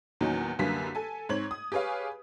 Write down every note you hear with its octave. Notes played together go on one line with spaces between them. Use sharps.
E2 A#2 D#3 F#3 C#4 D#4
C2 F#2 D3 A#3 B4 B6
A4 G#5
G#2 C4 C#5 G#6 F#7
D#6
G4 G#4 B4 C#5 F5